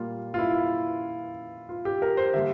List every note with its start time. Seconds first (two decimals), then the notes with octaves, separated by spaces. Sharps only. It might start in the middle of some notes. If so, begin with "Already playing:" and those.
Already playing: A#2 G3 A#3 F4
0.34 F4
0.39 E4
1.69 F4
1.85 G4
2.02 A#4
2.17 C5
2.34 D3 G3 A#3 E5